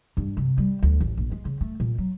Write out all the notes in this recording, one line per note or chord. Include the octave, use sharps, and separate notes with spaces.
G2
C3
G3
D2
A1
A#1
G#3
C#3
A3
A#2
F#3